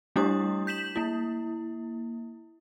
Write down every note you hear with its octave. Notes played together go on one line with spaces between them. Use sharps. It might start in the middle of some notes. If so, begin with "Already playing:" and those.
G3 A3 D4 E4 G4 D#6
G6 B6 E7 F#7
A#3 E4